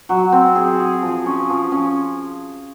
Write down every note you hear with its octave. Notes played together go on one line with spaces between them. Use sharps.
F#3
C4
G#4
G#4
F3
C#4
F3
C#4